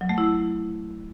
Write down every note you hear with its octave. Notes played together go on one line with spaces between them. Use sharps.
F#3
A3
E4